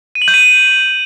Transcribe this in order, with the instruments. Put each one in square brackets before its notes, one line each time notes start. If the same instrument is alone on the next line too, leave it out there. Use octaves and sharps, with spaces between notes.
[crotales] D#7
F#7
G6
D#7